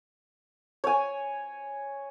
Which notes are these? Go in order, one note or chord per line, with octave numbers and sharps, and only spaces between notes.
C#5 G#5